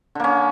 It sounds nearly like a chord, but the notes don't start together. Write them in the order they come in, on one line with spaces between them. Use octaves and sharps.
D3 A#3 C#4